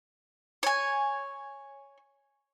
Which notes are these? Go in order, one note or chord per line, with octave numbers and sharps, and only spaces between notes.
C#5 G#5